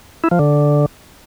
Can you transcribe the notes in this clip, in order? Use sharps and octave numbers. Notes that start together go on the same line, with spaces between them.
E4
F3
D3